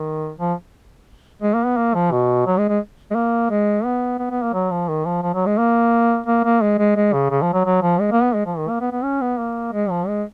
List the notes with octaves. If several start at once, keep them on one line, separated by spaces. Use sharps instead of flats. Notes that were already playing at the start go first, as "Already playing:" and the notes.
Already playing: D#3
F3
G#3
A#3
B3
A#3
F3
B2
F#3
G#3
G#3
G#3
A#3
G#3
B3
B3
B3
A#3
F#3
F3
D#3
F3
F3
F#3
G#3
A#3
A#3
A#3
G#3
G#3
G#3
C#3
C#3
F3
F#3
F#3
F3
G#3
A#3
B3
G#3
F3
D#3
A#3
B3
B3
C#4
B3
A#3
G#3
F3
G#3